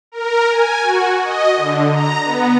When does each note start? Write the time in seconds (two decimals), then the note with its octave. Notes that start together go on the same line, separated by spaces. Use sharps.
0.12 A#4
0.51 G#5
0.82 F#4
1.24 D#5
1.56 D3
1.91 A#5
2.23 B3